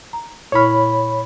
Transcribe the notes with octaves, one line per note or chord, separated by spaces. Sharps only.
A#5
A#2 E4 C#5 B5 F6